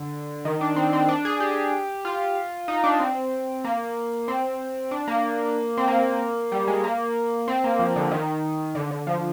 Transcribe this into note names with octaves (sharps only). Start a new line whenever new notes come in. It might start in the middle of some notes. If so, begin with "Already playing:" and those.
Already playing: D3
D#3
D4
C4
C4
D4
G#4
G4
F4
D#4
D4
C4
A#3
C4
D4
A#3
C4
A#3
G3
G#3
A#3
C4
A#3
F3
D3
D#3
D3
D3
F3